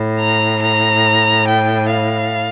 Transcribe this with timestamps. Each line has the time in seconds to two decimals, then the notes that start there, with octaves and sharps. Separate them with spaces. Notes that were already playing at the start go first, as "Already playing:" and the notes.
Already playing: A2
0.20 A#5
0.62 A#5
1.48 G5
1.90 F5